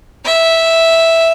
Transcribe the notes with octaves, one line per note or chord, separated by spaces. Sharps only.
E5